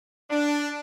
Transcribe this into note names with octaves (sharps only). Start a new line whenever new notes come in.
D4